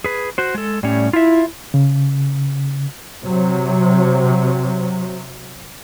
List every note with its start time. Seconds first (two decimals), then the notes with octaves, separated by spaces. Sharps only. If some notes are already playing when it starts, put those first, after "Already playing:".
0.04 G#4 B4
0.38 F#4 C5
0.55 G#3 A4
0.83 A2 G3 C#4
1.13 E4 F4 E5
1.74 C#3
3.25 C3 F#3